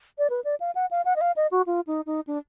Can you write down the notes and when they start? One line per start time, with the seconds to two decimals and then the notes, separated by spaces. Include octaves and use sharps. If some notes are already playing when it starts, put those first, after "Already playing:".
0.18 D5
0.30 B4
0.44 D5
0.60 F5
0.75 F#5
0.91 F5
1.05 F#5
1.16 D#5
1.21 F5
1.36 D#5
1.51 F#4
1.66 F4
1.87 D#4
2.06 D#4
2.27 D4